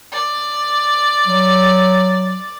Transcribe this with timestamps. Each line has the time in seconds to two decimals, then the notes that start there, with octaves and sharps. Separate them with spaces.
0.12 D5
1.27 F#3